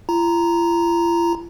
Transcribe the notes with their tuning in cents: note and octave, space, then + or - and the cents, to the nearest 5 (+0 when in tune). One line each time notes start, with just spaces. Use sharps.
F4 -45 A#5 +0